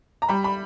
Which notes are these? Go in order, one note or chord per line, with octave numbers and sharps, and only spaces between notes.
A#5
G3 B5
B5